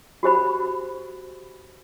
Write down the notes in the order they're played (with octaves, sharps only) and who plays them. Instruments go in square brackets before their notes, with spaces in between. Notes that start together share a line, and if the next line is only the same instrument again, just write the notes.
[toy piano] F#4 G4 C5 B5